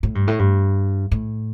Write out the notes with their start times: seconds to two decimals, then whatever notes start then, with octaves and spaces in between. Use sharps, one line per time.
0.03 A2
0.15 G2
0.27 A2
0.39 G2
1.12 A2